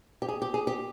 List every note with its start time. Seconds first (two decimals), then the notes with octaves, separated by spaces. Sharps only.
0.22 G4
0.28 G#4
0.42 G4
0.54 G#4
0.67 G4